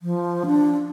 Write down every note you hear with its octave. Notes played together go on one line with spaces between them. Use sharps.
F3
D4